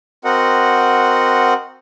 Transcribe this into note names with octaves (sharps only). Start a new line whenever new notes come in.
C4 F#4 A#4 D#5 F#5